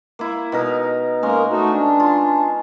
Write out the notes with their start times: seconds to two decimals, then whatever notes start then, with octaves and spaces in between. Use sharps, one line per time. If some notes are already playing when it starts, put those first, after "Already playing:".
0.19 A#3 E4
0.52 B2 D#4 A#4
1.23 G#3 A#3 C#4 A#4
1.52 A3 D#4 F#4
1.71 D4
2.00 F4